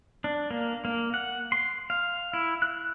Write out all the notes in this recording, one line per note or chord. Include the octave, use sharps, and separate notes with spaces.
D4
A#3
A#3
F#5
C6
F5
E4
F#6